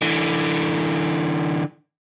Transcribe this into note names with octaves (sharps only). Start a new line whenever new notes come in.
D3 E3